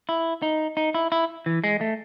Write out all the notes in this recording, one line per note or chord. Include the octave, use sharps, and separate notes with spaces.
E4
D#4
D#4
E4
E4
E3
G#3
A3